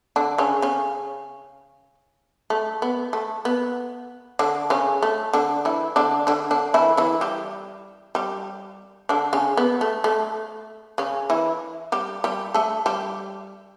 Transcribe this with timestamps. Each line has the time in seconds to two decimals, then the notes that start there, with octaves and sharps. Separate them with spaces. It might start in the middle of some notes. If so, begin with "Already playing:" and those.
0.16 D3 D4
0.38 C#3 C#4
0.62 C#3 C#4
2.50 A3
2.82 B3
3.13 A3
3.45 B3
4.39 D3 D4
4.70 C#3 C#4
5.02 A3
5.33 D3 D4
5.65 E3 E4
5.96 D3 D4
6.27 D3 D4
6.51 D3 D4
6.74 E3 E4
6.97 E3 E4
7.21 G3 G4
8.15 G3 G4
9.09 D3 D4
9.33 C#3 C#4
9.57 B3
9.81 A3
10.04 A3
10.98 C#3 C#4
11.30 E3 E4
11.92 G3 G4
12.24 G3 G4
12.54 A3 A4
12.86 G3 G4